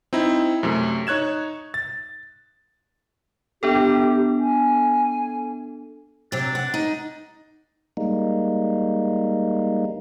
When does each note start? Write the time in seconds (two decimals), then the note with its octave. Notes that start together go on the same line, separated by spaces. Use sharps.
0.13 C4 D#4 E4
0.63 F#2 C3 A3
1.07 D#4 C#5 F#6 G#6 E7
1.74 A6
3.63 B3 D4 G4 A4
4.39 G#5
6.32 C3 F#3 D4
6.55 F#5
6.74 D#4
7.97 G3 G#3 A#3 D#4